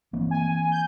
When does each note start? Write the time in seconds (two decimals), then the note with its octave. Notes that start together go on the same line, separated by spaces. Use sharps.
0.13 E3 A#3 C4
0.31 G#5
0.72 G6